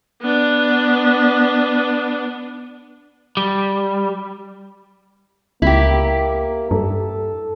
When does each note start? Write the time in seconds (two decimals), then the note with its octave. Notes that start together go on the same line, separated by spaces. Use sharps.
0.22 B3 D4
3.37 G3
5.62 C#2 A#3 E4 G4
6.71 G2 A4